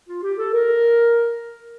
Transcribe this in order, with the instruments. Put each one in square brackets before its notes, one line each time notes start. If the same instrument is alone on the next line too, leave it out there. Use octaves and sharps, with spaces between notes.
[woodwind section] F4
G4
A4
A#4